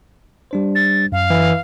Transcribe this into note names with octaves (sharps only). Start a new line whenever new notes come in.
G3 D4 C5
A6
F#2 F5
E3